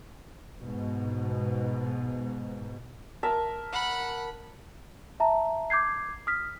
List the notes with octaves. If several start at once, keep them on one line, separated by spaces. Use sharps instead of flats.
G#2 B2
A#4 E5 A5
F#5 B5
E5 A5 A#5
D6 G6 G#6 C7
D#6 F6 B6